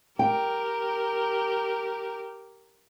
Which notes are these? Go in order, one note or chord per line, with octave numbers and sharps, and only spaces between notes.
G4 A#4 G5